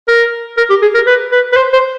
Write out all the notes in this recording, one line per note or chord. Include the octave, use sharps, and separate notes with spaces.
A#4
A#4
G4
G#4
A#4
B4
B4
B4
C5
C5